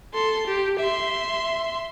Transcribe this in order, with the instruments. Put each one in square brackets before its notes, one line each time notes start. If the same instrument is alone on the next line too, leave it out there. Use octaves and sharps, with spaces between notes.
[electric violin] A4 C6
G4
E5 C6